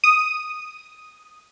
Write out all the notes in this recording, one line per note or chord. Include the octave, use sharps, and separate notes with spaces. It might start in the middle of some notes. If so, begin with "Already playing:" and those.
D#6